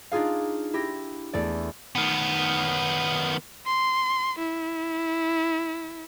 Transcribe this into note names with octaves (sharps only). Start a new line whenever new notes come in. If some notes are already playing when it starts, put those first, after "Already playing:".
D4 D#4 F4 G#4 F5
E4 G4 A#6
E2 A3 D5
D#3 B3
C6
E4